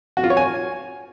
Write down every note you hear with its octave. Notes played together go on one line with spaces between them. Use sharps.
F#4
F4
C#5
G#5